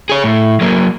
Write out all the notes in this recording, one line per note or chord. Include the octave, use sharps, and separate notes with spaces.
G#4 C#5
A2
F#3 A#3